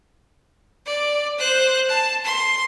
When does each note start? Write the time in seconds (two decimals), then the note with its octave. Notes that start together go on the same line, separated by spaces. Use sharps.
0.86 D5
1.39 C5 F#6
1.89 A5
2.25 C6